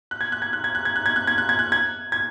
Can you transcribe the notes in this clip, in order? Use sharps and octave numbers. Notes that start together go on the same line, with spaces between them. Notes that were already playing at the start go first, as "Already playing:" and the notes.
F#6
G#6
F#6
G#6
F#6
G#6
F#6
G#6
F#6
G#6
F#6
G#6
F#6
G#6
F#6
G#6
G#6